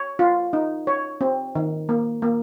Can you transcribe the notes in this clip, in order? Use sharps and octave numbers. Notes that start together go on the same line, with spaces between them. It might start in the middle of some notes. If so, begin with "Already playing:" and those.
Already playing: C#5
F4
D#4
C#5
C4
D#3
A#3
A#3